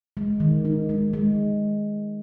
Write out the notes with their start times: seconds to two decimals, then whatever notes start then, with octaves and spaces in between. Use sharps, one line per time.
0.17 G#3
0.40 D#3
0.65 D#4
0.89 G#3
1.13 G#3